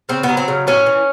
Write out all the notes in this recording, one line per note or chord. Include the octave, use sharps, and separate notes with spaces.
C#3 C4
B3
F#3
C4
C#3
A2 C#4
E3